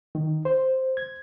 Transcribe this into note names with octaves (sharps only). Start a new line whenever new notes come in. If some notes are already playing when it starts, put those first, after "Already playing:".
D#3
C5
G#6